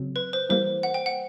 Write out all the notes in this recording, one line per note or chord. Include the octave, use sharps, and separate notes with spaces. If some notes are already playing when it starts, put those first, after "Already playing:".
Already playing: C#3 F#3 C4
B4
C5
E3 G3 A#3 C5
F#5
G5
F#5